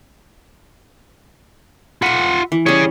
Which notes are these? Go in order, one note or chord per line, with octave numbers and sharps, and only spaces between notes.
F4 E5 F#5 B5
E3
G3 C#4 G#4 C#5